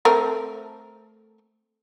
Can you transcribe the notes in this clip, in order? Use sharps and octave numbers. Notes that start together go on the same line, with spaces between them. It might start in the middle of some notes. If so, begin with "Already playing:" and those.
A3 C4 A#4